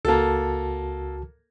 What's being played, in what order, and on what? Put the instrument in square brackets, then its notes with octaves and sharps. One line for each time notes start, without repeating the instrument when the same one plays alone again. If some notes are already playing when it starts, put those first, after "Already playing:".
[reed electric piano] C#2 F#4 A5 [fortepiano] A#3 A4